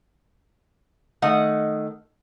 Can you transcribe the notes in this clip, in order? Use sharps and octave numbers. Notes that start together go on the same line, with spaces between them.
D#3 A3 D#5 F#5